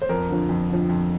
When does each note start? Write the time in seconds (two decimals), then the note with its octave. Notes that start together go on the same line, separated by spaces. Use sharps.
0.02 C5
0.09 F2 A#4
0.30 D3 F3
0.49 F2
0.69 D3 F3
0.89 F2